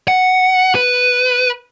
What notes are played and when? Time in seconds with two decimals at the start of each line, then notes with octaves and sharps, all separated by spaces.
0.08 F#5
0.75 B4